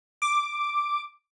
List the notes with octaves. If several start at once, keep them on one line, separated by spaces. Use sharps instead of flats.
D6